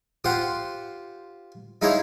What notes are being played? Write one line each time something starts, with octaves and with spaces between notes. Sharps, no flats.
F4 G4 C5 F#5
D#4 E4 G#4 C5 C#5 F5